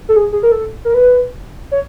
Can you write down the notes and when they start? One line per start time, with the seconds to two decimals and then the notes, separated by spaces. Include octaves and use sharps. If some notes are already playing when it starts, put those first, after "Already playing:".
0.09 A4
0.16 G#4
0.32 G#4
0.43 A#4
0.52 A4
0.85 A#4
0.94 B4
1.71 C#5